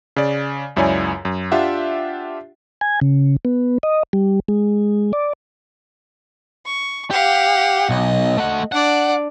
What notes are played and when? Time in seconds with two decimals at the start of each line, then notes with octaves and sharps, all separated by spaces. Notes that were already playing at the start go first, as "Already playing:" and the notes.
0.16 C#3 D5
0.76 C#2 F#2 E4 C#5 D5 G#5
1.25 F#2
1.52 D4 F4 G4 E5 F#5
2.81 G#5
3.01 C#3
3.45 B3
3.83 D#5
4.13 G3
4.48 G#3
5.13 D5
6.66 C#6
7.11 G4 F5 F#5
7.89 B1 D#5
8.37 A3 F#5
8.72 D4 D5 F#5